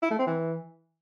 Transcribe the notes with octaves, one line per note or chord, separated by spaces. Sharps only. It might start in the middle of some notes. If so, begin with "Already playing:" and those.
E4
A3
C4
E3